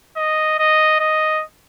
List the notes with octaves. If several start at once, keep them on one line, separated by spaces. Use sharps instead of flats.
D#5
D#5
D#5